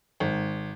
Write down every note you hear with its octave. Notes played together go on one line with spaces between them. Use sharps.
G#1